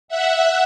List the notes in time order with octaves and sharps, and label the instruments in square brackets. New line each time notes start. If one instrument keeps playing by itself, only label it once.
[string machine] E5 F#5